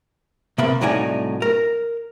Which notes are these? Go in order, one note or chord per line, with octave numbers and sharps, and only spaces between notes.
C3 A#3 B5
C2 A2 F#3 D#4 D5 G#5
A#4